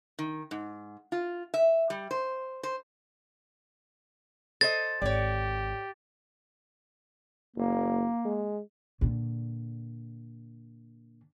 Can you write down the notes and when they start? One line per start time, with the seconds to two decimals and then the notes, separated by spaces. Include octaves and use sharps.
0.19 D#3
0.51 G#2
1.12 F4
1.54 E5
1.90 G3
2.11 C5
2.63 C5
4.61 A4 C5 D#5 A6
5.02 G#1 G4 C#5 D5
7.56 F#1 A#3
8.25 G#3
9.01 A#2 D3